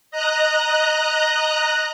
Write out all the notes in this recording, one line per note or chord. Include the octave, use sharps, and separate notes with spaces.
D#5 A#5 F#6